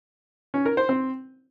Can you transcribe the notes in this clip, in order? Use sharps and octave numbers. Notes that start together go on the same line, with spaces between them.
C#4
A#4
C5
C4